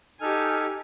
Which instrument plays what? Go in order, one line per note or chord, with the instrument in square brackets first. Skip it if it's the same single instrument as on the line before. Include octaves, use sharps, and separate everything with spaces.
[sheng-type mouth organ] D#4 A4 F6 [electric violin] G4 G#5